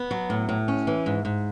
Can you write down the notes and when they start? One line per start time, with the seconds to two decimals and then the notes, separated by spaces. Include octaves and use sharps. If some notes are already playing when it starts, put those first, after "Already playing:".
Already playing: B3
0.11 F#3
0.30 A2
0.49 A2
0.68 C#4
0.87 E3
1.06 G#2
1.25 G#2